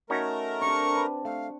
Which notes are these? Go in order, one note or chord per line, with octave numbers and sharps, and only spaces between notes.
A3 C#4 D#4 F#4 A#4
C4 D4 C#6
D4 B4
A3 F5 C#6